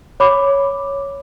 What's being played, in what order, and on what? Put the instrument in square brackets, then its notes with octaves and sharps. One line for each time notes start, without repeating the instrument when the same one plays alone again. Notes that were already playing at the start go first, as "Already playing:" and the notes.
[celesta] C#5 B5 D6